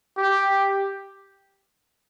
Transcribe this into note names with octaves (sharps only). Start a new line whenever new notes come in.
G4